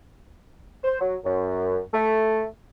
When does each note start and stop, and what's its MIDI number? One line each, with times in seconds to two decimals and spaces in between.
0.84 0.99 72
1.01 1.15 54
1.25 1.80 42
1.94 2.44 57